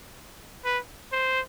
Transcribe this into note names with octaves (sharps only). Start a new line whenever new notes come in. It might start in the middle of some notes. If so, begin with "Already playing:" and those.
B4
C5